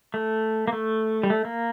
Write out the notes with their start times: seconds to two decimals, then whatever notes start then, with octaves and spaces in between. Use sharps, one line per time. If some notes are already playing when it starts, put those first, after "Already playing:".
0.14 A3
0.68 A#3
0.72 A3
1.23 G3
1.30 A3
1.45 A#3